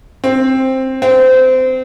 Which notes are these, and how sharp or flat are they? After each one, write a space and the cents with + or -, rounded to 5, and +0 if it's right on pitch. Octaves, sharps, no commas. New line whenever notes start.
C4 +10
C4 -20